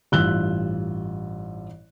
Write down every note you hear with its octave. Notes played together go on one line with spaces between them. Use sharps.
A1 G2 F4 E6 F#6 G7